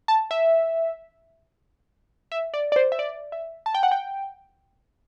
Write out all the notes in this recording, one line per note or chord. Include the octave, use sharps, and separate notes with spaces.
A5
E5
E5
D5
D5
C5
E5
D5
E5
A5
G5
F#5
G5